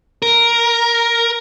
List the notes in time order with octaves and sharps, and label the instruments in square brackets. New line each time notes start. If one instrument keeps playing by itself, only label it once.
[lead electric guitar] A#4